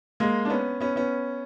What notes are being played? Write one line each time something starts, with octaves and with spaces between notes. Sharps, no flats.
G#3 A#3
D4
B3 C#4
B3 C#4
B3 C#4